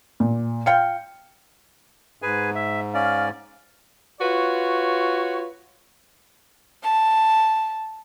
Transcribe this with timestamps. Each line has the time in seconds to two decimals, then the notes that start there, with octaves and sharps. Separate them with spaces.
0.20 A#2
0.66 F4 F5 G5 C#7
2.22 G#2 G#4 B4 G#5
2.55 E5
2.94 C#4 D5 F5
4.20 F4 F#4 B4 C#5
6.84 A5